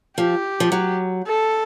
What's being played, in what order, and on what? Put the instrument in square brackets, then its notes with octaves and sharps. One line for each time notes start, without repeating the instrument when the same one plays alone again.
[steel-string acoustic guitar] F3 [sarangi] G4
[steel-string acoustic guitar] F3
F#3
[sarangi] A4